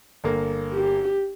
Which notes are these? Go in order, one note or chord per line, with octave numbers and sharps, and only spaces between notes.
G1 A#3
G4